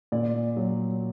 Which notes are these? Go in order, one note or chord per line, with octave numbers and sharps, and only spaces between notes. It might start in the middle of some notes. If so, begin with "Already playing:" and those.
A#2 D5
F#3